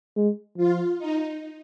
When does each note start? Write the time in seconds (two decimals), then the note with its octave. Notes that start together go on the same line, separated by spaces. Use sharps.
0.16 G#3
0.57 F3 F4
0.98 D#4